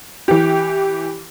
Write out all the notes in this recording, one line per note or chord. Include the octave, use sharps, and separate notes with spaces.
E3 G4